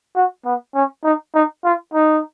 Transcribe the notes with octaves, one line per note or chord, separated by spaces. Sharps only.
F#4
B3
C#4
D#4
D#4
F4
D#4